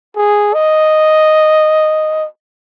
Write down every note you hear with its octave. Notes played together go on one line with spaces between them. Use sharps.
G#4
D#5